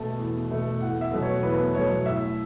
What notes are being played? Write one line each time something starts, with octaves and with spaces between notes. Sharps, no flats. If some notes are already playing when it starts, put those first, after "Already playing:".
Already playing: B2 A3 A5
E2
B2 A3
E2 F#5
E5
B2 F#3 A3
C#5
E2 B4
B2 F#3 A3 C#5
A2 E5